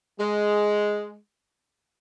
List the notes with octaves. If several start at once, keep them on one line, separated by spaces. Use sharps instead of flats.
G#3